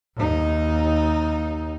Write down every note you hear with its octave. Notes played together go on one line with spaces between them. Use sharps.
D#2 D#4